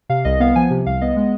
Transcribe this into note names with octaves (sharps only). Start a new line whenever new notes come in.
C3 F5
C2 D#5
B3 F5
F3 G#5
C3
C2 F5
B3 D#5
G#3